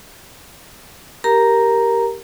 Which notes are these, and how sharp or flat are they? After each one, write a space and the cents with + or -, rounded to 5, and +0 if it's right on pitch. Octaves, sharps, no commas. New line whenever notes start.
G4 +0 A#4 +0 A#5 +0